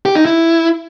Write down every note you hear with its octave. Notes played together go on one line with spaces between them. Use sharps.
G4
D#4
E4